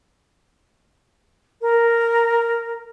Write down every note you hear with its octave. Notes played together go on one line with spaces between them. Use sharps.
A#4